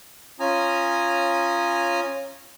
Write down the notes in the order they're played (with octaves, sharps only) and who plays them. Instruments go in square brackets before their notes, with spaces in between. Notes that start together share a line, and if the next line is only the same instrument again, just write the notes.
[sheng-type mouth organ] C#4 F4 G#5 A#5 D#6